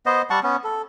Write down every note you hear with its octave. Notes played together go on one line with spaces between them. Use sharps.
B3 C5 D#5
G3 F#5 A5 C#6
B3 C#4
A4